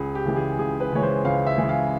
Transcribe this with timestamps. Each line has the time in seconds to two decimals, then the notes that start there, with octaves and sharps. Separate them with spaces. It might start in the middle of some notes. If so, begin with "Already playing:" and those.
Already playing: C#2 G#4
0.15 G4
0.25 C#3 E3 G#3
0.36 G#4
0.59 C#2 G#4
0.80 B4
0.92 C#3 E3 G#3 C#5
1.03 C5
1.25 C#2 F5
1.46 E5
1.58 C#3 E3 G#3
1.69 F5